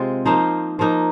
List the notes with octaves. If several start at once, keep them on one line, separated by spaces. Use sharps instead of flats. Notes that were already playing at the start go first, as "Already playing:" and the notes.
Already playing: C3 G#3 F4
F3 A#3 D#4 C5 F5
F3 A#3 D#4